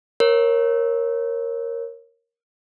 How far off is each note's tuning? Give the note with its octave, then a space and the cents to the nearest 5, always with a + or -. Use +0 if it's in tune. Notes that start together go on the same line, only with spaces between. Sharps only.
A#4 +5 C#5 -20